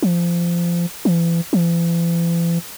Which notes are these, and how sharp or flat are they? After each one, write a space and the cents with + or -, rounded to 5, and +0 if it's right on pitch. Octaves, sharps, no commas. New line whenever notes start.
F3 -20
E3 +35
E3 +45